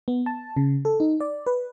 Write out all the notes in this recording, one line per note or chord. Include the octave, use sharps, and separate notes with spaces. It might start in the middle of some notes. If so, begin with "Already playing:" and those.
B3
A5
C#3
A4
D#4
D5
B4